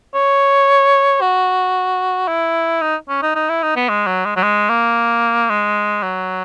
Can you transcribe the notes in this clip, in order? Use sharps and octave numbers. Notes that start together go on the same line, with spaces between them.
C#5
F#4
E4
D#4
C#4
D#4
D#4
E4
D#4
B3
G#3
F#3
G#3
F#3
G#3
A#3
G#3
F#3